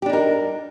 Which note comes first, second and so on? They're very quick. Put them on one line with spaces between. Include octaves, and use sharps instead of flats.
G4 D4 D#4 A#4